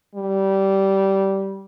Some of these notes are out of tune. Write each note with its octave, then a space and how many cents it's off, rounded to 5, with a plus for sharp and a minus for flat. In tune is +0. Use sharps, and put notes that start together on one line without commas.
G3 -15